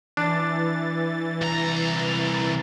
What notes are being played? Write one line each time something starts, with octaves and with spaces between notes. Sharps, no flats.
E3 D4 A6
C2 A#5